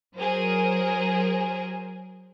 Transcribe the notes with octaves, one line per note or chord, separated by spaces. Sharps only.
F#3 G#4 A#4 C5